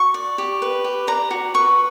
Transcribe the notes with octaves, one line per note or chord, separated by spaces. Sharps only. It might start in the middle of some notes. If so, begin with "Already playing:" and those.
Already playing: F#4 C#6
D5
G4
B4
G4
D5 A#5
F#4
B4 C#6